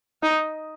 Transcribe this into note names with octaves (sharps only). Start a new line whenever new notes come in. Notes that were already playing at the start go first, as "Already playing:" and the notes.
D#4